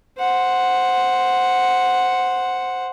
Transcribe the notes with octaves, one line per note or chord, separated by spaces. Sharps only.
C5 F#5